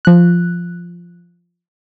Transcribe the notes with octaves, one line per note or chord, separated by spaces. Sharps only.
F3 F#6